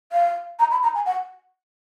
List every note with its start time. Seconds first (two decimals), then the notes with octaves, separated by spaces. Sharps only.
0.12 F5
0.59 A#5
0.71 B5
0.83 A#5
0.95 G#5
1.06 F#5